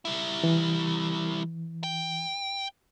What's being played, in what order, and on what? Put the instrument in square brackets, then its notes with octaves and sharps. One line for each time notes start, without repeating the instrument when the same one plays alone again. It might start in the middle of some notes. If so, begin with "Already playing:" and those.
[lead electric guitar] G3 E4
[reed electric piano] E3
[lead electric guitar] G5